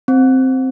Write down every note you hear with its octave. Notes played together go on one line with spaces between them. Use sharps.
C4